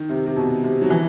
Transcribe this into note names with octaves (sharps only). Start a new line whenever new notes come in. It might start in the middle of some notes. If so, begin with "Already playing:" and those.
Already playing: D#3
C3
C3
B2
C3
F#3
E3